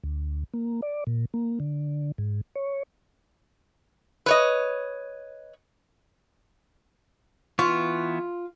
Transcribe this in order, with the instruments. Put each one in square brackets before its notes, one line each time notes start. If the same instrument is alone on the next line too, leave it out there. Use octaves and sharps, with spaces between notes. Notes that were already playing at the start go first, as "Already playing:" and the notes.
[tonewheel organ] D2
A#3
D5
A#2
A#3
D3
G#2
C#5
[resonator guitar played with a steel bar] B4 C#5 D#5
[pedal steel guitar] E3 B3 C#6 [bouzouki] F4